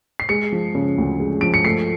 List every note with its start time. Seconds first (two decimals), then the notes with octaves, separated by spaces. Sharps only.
0.20 C7
0.29 G#3 C#7
0.52 F3
0.75 C#3
0.98 D2
1.20 G#3
1.41 F3 D7
1.54 C#7
1.65 A3 C7